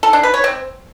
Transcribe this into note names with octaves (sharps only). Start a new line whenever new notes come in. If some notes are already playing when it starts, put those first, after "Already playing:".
A4
D4
B4
C#5
C4